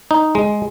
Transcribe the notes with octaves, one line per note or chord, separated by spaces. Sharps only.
D#4
G#3